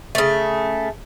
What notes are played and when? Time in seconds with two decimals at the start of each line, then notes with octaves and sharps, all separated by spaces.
0.15 C#3 A3